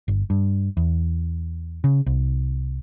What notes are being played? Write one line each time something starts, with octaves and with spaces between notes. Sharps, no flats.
G1
G2
E2
C#3
C2